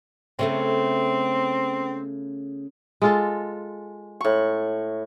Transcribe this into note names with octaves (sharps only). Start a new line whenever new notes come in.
C#3 A3 B3 C4
G#3 F4 A4
A2 C#6